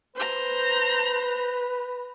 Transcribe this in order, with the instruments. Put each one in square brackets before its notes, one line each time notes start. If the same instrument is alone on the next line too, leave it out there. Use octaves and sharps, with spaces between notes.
[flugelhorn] B4 [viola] C5 A#5